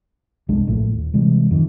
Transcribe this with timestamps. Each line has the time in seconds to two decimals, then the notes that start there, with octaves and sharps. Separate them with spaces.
0.48 F#1 C2 G#3 D4
0.67 A#1 A2 A3
0.92 D#1
1.14 C3 E3 G3 G#3
1.51 F2 D#3 E3